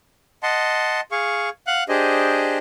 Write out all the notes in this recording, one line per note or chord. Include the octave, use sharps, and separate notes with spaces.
D#5 F#5 A5 C6
G#4 F5 C#6
F5 F#5 F#6
D4 G4 G#4 C5 D#5